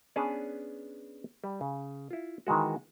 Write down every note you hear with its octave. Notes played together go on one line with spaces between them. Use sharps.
B3 C#4 D4 G#4 B4 A5
G3
C#3
E4 F4
D#3 E3 G#3 F#4